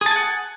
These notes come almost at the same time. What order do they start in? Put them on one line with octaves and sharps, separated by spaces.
G#4 A5 G#5 F#5